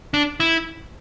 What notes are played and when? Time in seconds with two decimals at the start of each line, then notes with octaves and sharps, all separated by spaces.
0.14 D4
0.40 E4